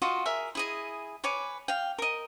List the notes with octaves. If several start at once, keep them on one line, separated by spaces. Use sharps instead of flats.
F4 F#4 D#5 F5
G#4 A#4 E5
E4 G#4 D#5
B4 C#5 G#5 D6
F5 G5
A#4 D#5